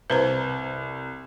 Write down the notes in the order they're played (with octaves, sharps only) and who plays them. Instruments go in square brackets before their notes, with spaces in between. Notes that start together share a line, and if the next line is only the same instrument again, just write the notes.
[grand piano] C2 [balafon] B4 C5 A#5